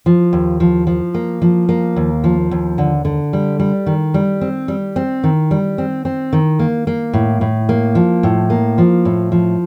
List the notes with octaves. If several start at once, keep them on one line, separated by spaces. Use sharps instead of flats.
F3
D#2
F3
F3
A#3
F3
A#3
D#2
F3
D#2
D3
D3
G3
G3
D#3
G3
C4
G3
C4
D#3
G3
C4
C4
D#3
A#3
A#3
A2
A2
A#3
F3
A2
A#3
F3
A2
F3